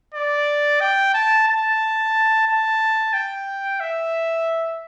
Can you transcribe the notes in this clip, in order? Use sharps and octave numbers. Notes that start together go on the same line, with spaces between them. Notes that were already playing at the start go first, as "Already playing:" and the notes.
D5
G5
A5
A5
A5
G5
E5